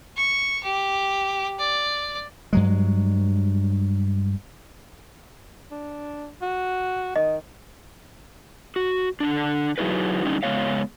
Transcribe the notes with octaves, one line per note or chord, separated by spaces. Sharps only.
C#6
G4
D5
G2 F#3 G#3
D4
F#4
D#3 D#5
F#4
D3 D4
F#3 D#4 E4 F#4 G#4 B4
D3 G3 C#4 D#4
C#3 F3 G#3 B3 C#5 F5